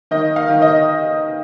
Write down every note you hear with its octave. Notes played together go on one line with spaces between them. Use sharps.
D#3 D#5
F5
D#3
D#5